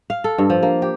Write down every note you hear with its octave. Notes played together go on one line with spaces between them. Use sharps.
F5
A4
G2
F3
A#3
G4